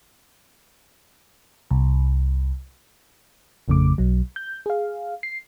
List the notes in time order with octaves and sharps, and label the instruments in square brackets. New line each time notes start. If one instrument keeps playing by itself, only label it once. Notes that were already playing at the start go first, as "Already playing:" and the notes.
[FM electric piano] C2
A1 F2 C#3 A3 D6
B1 F#3
G6
G#4 F5
C7